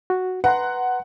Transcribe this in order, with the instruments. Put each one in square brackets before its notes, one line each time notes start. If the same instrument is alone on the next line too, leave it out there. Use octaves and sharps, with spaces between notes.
[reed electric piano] F#4
[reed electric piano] B4 A#5 C6 [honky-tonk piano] F#5